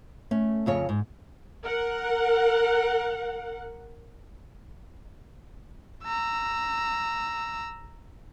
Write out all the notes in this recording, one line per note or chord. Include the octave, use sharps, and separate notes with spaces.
A3 C#4
F2 C#3 C#5
G#2
A#4 F#5
A#5 E6